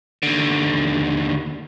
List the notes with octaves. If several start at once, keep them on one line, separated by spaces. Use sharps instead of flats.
D#2 D3